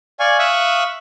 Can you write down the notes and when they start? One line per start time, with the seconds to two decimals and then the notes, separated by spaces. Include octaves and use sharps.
0.20 D5 F5 G#5 C#6
0.39 E5 F5 C#6 D#6 E6 F#6